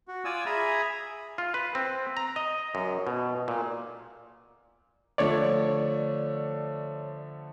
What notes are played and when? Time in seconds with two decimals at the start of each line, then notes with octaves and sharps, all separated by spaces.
0.08 F#4
0.25 F4 D5 G#5 D#6 E6
0.46 G#4 E5 G#5 A#5 B5
1.38 F4
1.54 B4
1.75 C4
2.17 A#5
2.36 D#5
2.75 F#2
3.07 B2
3.48 A#2
5.18 D3 F3 A3 C#5 D5